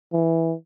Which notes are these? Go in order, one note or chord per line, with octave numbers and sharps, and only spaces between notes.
E3